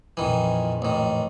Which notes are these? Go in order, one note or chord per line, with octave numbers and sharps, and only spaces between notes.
A#1 F2 D#3 E3
A1 D#3